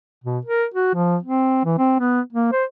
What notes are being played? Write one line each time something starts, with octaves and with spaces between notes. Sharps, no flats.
B2
A#4
F#4
F3
C4
E3
C4
B3
A#3
C5